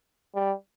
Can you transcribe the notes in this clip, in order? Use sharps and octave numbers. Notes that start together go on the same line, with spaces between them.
G3